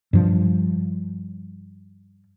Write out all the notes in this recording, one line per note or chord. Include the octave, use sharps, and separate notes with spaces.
G2 F3